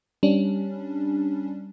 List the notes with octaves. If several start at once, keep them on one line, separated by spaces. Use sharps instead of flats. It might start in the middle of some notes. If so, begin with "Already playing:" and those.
G3 C#4 D4